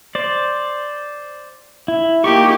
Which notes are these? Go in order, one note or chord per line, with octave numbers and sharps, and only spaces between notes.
C5 D5
E4
A#3 D#4 G4 C#6